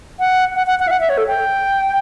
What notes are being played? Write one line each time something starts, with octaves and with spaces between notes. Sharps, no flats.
F#5
F#5
F#5
F#5
E5
F#5
E5
C#5
A4
G5